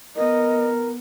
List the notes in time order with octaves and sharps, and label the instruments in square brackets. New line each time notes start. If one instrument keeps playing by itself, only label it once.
[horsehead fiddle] B3 [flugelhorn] A#4 [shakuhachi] D#5